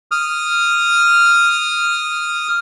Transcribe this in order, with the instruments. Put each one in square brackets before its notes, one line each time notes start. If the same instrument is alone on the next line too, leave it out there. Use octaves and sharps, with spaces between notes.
[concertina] D#6 F6